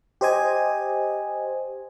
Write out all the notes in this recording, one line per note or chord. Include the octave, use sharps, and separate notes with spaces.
G4 C5 D#5 G#5